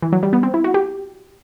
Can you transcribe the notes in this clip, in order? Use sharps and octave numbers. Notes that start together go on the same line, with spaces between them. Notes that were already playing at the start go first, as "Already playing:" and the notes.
E3
F#3
G3
B3
C4
E4
F#4
G4